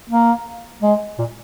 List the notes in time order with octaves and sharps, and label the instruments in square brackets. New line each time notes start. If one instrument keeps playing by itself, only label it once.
[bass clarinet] A#3
G#3
A#2